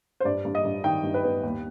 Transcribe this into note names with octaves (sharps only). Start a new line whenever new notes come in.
C5
G2 D5
G2
D#5
G2
D#3 G5
G2
B4
B3
D#2